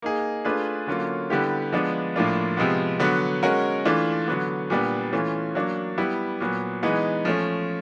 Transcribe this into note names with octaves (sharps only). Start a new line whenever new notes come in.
A#3 D#4 G#4
A3 D4 F4 G#4 B4
D3 F#3 A#3 C#4 F4
D3 G3 B3 E4 G4
F3 G#3 B3 D4
A2 F3 A#3 D4 F4
C3 F3 G#3 B3
D3 F#3 B3
G#3 C#4 F#4 A#4
E3 A3 D4 F4
D3 F#3 B3
A#2 G3 B3 D4
E3 A3 C#4 F4
F#3 A#3 D4
G3 B3 E4
A#2 F#3 B3
E3 G#3 B3 D#4
F3 A3 C#4